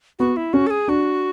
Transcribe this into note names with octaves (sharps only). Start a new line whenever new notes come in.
B3 F#4
E4
C#4 F#4
A4
G#4
D4 F#4